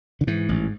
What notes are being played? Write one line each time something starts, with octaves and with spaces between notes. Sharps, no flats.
D3
G#2 E3
A1